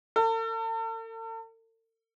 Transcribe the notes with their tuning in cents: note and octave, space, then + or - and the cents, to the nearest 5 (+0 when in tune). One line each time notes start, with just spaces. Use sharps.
A4 +45